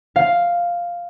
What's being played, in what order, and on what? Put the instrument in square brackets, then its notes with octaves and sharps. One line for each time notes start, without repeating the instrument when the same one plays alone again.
[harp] F5